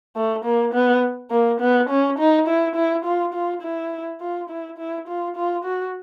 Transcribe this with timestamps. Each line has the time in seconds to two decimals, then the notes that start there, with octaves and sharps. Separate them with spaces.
0.16 A3
0.45 A#3
0.74 B3
1.31 A#3
1.60 B3
1.90 C#4
2.19 D#4
2.47 E4
2.76 E4
3.05 F4
3.34 F4
3.62 E4
4.21 F4
4.50 E4
4.78 E4
5.08 F4
5.36 F4
5.65 F#4